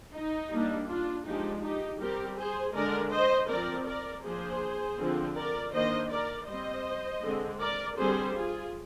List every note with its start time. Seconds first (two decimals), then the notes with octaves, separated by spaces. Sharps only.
0.13 D#4
0.51 G3 A#3 D4
0.88 D4 F4
1.25 F3 G#3 D4 D#4 G4
1.62 D#4 G4
2.00 G3 C4 G4 A#4
2.37 G#4 C5
2.74 D3 G#3 D4 A#4 D5
3.11 C5 D#5
3.49 F3 C4 A#4 D5
3.86 A#4 D5
4.24 F3 A#3 D4 G#4 C5
4.98 D3 F3 C4
5.36 A#4 D5
5.73 D#3 A#3 D4 C5 D#5
6.10 A#4 D5
6.48 G3 C4 C5 D#5
7.22 D3 G#3 C4
7.60 A#4 D5
7.97 D3 G3 C4 G#4 C5
8.34 F4 G#4